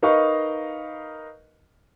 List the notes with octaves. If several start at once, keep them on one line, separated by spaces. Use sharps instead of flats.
D#4 A#4 B4 D#5 F5 C#6